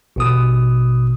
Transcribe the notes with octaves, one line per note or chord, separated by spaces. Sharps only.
A1 B2 D#6